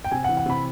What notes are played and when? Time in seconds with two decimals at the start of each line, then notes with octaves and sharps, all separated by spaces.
0.05 G5
0.11 C3 G#5
0.24 F#5
0.29 E3
0.37 F#5
0.46 C3 B5